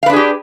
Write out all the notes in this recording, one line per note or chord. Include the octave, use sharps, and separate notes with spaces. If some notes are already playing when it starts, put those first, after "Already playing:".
D4 G4 G#4 B4 F5